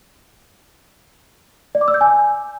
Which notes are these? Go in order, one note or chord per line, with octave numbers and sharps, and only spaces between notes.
D5
D6
E6
G6
G#5